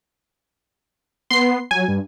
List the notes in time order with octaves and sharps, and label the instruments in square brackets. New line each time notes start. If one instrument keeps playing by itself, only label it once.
[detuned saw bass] B3 [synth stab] C6 C7
[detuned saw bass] F#3 [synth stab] G#5
[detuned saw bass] G2